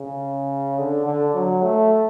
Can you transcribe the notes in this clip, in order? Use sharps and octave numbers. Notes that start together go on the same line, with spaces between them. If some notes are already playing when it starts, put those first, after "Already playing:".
Already playing: C#3
D3
D3
F#3
A3